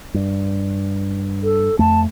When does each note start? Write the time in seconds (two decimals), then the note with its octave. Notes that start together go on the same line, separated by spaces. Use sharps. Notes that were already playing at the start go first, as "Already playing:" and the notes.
0.14 G2
1.43 A4
1.79 F2 A3 A5